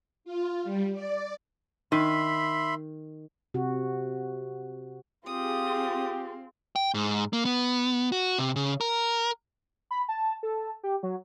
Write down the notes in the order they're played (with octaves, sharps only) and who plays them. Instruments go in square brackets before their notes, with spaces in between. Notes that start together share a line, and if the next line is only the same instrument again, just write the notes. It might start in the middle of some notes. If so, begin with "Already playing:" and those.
[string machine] F4
G3
D5
[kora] D#3 [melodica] E5 B5 C6
[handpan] C3 F#4
[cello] C4 [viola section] F4 G#4 [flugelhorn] G4 [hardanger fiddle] D#6
[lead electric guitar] G5
G#2
A#3
B3
F#4
C3
C#3
A#4
[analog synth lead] B5
A5
A4
G4
F#3